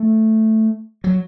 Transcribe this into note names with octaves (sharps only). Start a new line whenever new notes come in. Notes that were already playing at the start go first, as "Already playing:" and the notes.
Already playing: A3
F#3